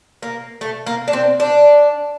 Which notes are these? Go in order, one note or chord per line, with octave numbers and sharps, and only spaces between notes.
A#3
A3
A#3
D4
C4
D4